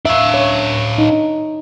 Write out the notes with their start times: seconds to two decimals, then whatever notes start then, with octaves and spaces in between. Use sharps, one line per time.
0.05 D4 E5 F5
0.34 C#5
0.98 D#4